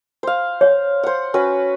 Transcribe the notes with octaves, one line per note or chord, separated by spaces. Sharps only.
C5 F5
C#5
C5 F#5
C#4 F#4 B4